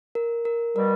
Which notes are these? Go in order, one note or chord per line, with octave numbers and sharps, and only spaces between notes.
A#4
A#4
B2 G3 A#4